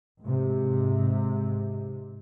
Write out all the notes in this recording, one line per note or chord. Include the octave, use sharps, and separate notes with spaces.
G#2 C3